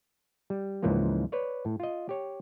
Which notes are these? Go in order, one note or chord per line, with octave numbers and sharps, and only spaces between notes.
G3
C#2 G#2 E3 F3 A#3
B4 C#5 D5
A2
F4 D#5
G4 C#5